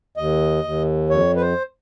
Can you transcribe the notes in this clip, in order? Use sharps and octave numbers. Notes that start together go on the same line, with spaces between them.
D#2 D#5
D#2
F2 C#5
B4
C5